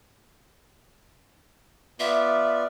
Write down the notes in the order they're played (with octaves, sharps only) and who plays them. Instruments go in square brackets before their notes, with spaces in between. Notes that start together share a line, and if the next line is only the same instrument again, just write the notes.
[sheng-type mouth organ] B3 F4 D5 [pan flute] E5